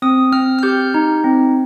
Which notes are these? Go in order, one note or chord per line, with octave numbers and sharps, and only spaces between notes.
C4 D#6
C4 F6
F6
G4 G6
D#4
C4